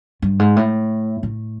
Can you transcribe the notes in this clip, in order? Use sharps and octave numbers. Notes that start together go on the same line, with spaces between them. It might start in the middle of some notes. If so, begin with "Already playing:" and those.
G2
G#2
A2
A2